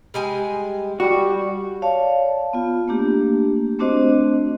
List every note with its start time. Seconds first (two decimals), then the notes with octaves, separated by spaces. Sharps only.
0.14 G3 G#3 G#5
1.00 G3 F#4
1.82 C#5 D5 F5 A5
2.53 B3 F4
2.88 A3 A#3 D4 G4
3.79 A3 C4 D4 F#4 C5 D#5